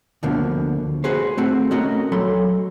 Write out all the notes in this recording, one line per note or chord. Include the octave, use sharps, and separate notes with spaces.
D2 B2 D3 F3 A#3
F#4 G#4 B4 C5
A3 C4 F#4
A3 C#4 F#4 A#4 D#5
F#3 A4 B5 C6